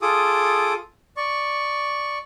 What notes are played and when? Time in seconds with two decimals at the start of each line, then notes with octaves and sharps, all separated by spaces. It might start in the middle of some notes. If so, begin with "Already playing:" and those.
0.02 F4 G#4 A4 D6 D#6
1.17 D5 C#6